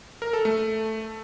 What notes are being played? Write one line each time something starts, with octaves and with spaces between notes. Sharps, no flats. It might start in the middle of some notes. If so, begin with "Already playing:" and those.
A#4
A4
A3